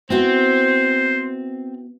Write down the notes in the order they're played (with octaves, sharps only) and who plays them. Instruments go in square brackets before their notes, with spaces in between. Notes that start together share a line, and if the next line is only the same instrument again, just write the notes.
[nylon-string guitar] B3 E4 F#4 [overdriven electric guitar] C4 [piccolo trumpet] C5